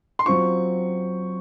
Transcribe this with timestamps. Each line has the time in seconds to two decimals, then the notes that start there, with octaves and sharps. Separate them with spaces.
0.19 C6
0.26 F#3 C4 F4 C#6